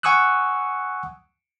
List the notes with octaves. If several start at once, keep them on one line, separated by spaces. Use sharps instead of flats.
F#5 G#5 C#6 D#6 E6 F#6